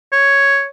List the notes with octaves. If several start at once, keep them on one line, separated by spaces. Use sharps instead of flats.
C#5